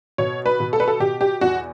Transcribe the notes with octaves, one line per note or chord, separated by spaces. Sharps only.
B2 C#5
B4
B2
A4
B4
A4
B2 G4
G4
E2 F#4